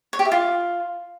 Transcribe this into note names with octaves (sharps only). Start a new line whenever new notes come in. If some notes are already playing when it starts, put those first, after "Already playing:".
C#5
G4
E5
F4